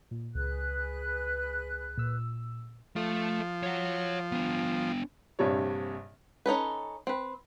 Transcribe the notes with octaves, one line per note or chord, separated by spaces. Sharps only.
A#2
C#2 G#4 B4 F#6
A#2 E6
F3 A3 A4
C#5 F#5
B3 D4
A#1 G2 C3 G3 C#5
C#4 D#4 A4 B4
C4 B4